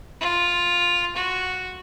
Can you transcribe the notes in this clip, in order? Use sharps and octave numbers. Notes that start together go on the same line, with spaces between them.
F4
F#4